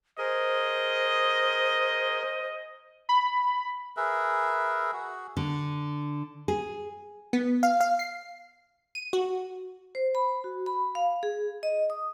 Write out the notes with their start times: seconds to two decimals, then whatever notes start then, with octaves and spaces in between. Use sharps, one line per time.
0.18 G#4 A#4 C5 D#5
3.09 B5
3.97 G#4 A#4 B4 E5
4.93 F#4 G#4 F#5
5.37 D3
6.48 G#4
7.33 B3
7.63 F5
7.81 F5
7.99 C7
8.95 D#7
9.13 F#4
9.95 C5
10.15 B5
10.44 F#4
10.66 B5
10.95 F5
11.23 G#4
11.63 D#5
11.90 D#6